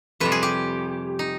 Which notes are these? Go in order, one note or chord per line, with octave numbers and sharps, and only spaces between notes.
F2 C3 G3 B4
G#4
G4
D#4